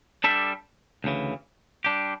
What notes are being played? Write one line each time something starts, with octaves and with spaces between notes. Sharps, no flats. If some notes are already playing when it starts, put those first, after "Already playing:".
G3 D4 A4 E5
D2 C#3 E3
G3 D4 G4